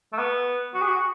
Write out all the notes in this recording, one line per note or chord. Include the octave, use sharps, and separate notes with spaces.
A3
B3
F#4
G#4
F#4